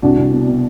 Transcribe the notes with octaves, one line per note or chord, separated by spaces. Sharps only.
C2 D4 F#4
C2
B2
B2